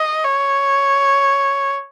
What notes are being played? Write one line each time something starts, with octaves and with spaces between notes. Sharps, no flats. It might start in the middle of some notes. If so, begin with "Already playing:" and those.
Already playing: D#5
C#5